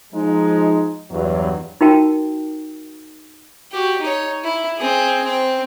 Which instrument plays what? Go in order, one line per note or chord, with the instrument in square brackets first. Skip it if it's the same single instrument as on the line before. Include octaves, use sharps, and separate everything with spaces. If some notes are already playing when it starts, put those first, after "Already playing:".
[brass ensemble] F3 G#3 D#4
E2 G2 F#3
[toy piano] D#4 F#4 A#4 G5 A5
[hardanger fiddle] F#4 G4
D#4 C#5
E4
C4 G#4
C4